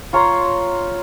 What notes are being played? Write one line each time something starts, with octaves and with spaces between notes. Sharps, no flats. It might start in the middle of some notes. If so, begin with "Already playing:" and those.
F4 C#5 A#5 C6